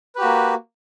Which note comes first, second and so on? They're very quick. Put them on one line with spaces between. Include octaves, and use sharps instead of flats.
B4 G4 F#4 A#3